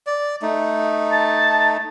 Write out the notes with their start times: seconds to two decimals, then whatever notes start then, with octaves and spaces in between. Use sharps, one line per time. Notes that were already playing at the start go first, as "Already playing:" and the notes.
0.07 D5
0.42 A3 D#4
1.11 A5